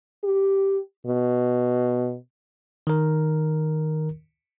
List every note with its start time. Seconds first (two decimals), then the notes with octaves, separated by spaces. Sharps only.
0.24 G4
1.06 B2
2.87 D#3 A#4